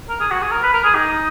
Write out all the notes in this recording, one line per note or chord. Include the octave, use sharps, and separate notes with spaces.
A#4
G#4
F#4
G#4
A#4
B4
A#4
G#4
D#4